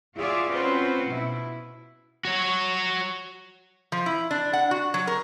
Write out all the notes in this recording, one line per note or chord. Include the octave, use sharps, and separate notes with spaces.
F4 F#4 G#4 D5 E5 F5
C4 C#4 F4 F#4 B4 C5
B2 E4
F#4 C#5
F3
E4
D4
F#5
F#4
F#3
A#4